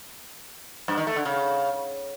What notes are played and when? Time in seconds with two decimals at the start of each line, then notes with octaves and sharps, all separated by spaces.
0.88 G2
0.97 D#3
1.07 A3
1.16 D3
1.25 C#3